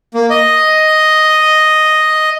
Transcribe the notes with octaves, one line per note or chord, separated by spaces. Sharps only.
A#3
D#5